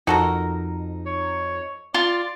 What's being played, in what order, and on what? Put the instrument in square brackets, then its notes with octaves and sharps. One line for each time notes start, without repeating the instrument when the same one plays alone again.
[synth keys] F2 D#4 [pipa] F#4 A4 A#4
[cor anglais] C#5
[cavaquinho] F4 [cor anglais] D5